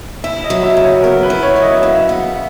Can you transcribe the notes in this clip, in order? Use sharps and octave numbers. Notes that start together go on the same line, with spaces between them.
E4 E5
D#5
F#3
E5
C#3
C#5
B3 A#4
B4
E4
C#5
F#3
D#5
C#3 E5
B3